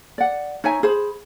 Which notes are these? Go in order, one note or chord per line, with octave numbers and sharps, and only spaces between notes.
D5 F#5
D#4 C#5 E5 G#5
G#4 C5 B5